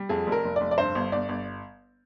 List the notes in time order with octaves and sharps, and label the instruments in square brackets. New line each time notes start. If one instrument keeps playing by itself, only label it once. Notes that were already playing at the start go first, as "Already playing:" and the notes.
Already playing: [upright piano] G3
F2 G#4
F1
A#4
F1
F1 D5
D5
G2 C5
G1
G1 D5
G1